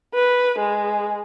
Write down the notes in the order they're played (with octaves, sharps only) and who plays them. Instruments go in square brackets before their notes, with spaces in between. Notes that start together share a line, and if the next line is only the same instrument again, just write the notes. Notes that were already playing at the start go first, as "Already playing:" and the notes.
[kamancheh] B4
G#3